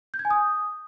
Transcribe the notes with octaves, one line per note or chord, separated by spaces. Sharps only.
G6
G#6
G#5
D#6